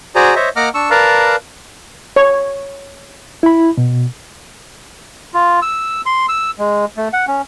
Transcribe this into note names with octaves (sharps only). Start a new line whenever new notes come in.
F#4 G#4 C5 D5 G#5 A#5
C5 C#5 D#5 E5
A#3 D#5 F#5 A#5 D6 F6
D4 C#6 E6
A#4 B4 D5 F5 A5 A#5
C#5
E4 B5
B2
F4
E6
C6
E6
G#3
A3
F#5
C#4